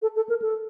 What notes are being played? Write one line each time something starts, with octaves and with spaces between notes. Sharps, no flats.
A4
A4
A#4
A4